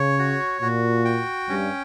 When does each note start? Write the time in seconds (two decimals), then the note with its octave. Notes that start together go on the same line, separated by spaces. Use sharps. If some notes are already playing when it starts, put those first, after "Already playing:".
Already playing: C#3 C#5
0.19 F#4
0.61 A#2 F#4
1.05 G5
1.48 G2 C#4